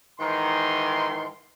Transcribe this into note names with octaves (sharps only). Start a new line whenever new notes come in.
G#2 D#3 E3 C6